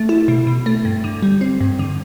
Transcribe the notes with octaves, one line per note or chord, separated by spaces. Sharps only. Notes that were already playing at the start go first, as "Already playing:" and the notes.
Already playing: A3
E4
B2
B2
A3
G2
D3
G3
C4
G2
D3